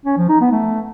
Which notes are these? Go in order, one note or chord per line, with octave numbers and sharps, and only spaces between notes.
C#4
F3
D#4
B3
A3